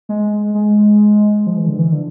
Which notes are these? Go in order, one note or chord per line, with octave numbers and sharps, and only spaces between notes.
G#3
G#3
F3
E3
D3
E3
D3